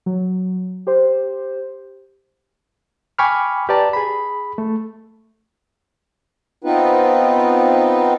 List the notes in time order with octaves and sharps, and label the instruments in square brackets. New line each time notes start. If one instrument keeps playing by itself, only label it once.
[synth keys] F#3
G4 C5
[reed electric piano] G5 G#5 B5 C#6 D6 F6
G4 B4 D5 A5 A#5
G#4 B5
A3
[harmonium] B3 C4 D#4 F4 B4